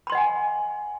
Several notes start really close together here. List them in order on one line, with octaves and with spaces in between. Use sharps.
B5 C6 D#5 F#5 G#5